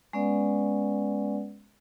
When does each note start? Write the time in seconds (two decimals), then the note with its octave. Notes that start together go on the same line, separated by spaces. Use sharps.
0.13 G#3 B3 C#4 B4 D5 F#5